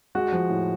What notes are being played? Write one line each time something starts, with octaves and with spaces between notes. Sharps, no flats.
G#3 F#4
F3
A2